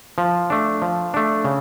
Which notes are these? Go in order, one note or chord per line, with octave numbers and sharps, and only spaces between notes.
F3
A3 D4
F3
A3 D4
C#3